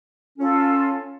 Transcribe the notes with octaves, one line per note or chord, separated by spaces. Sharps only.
C#4 F4 A4